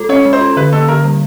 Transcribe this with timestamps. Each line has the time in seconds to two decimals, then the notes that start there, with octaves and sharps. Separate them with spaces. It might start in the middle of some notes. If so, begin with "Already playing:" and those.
Already playing: G#3 F4 A4
0.09 C#4 C#5
0.25 G#3
0.33 C5
0.41 F4
0.57 D3 B4
0.72 A#3 A4
0.88 D3 A#4
1.04 G3